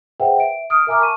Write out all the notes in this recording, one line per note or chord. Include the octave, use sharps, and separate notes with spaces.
G#4 B4 C5 E5 F#5 G5
E5 D7
D#6 F6 D7
A#4 E5 G#5 A#5 D6 F6
A5 C#6 D#7